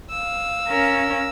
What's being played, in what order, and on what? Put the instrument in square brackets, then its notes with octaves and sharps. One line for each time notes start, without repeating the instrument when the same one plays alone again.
[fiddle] F5 E6
[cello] C#4 A#4